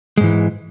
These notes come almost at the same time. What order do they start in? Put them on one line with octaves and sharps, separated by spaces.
G#3 G#2 E3